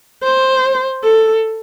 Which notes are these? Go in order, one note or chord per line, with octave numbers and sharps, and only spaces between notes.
C5
A4